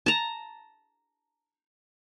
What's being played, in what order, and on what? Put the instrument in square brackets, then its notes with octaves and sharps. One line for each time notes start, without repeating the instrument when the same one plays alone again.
[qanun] A5 A#5